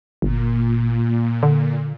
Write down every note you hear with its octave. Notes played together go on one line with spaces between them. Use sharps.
G1 A#2
D3